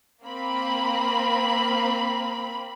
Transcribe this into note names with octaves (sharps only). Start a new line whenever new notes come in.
A#3 C4 B5